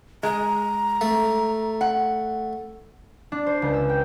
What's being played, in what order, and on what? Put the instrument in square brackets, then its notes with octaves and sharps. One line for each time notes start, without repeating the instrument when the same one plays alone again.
[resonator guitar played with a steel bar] G#3 [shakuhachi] A#5
[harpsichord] A3
[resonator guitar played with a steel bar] F#5
[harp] D4
C5
C#2
E6
G5